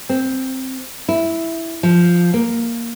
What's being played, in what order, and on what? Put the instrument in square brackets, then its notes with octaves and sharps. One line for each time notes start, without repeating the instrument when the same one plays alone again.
[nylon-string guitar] C4
E4
F3
A#3